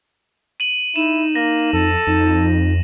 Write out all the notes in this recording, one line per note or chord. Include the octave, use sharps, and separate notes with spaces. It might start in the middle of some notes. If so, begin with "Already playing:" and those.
D#7 F#7
D#4 E4 E7
A#3 A#6
F2 A4
F2 D#4